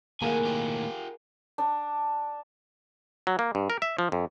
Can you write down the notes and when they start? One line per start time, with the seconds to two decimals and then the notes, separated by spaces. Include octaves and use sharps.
0.22 D#2 A2 C3 A#3 G#4 A#4 F#5 G#5
0.46 F4 G4
1.58 D4
3.27 F#3
3.39 A#3
3.55 G2
3.70 A#4
3.82 E5
3.99 F3
4.12 F2